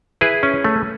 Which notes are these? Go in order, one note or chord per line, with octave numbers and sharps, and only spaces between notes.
E4 G#4 B4
C#4
A3